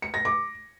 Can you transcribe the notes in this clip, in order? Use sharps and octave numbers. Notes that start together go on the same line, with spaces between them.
C#7
A#6
D6